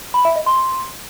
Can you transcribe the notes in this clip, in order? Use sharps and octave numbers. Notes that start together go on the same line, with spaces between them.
B5
E5
D#5
C6